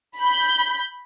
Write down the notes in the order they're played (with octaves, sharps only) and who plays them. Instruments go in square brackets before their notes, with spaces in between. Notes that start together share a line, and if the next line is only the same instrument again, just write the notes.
[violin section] B5 G6